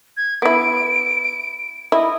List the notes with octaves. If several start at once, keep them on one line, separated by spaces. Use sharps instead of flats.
G#6
B3 E4 D7
E4 D#5